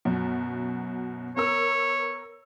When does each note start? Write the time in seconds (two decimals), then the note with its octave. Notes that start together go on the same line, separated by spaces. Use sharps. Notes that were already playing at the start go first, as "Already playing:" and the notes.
0.05 F#2 B2
1.37 B3 A#4 C#5 E6